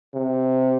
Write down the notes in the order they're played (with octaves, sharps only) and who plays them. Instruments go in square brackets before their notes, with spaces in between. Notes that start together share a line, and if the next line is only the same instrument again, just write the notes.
[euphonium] C3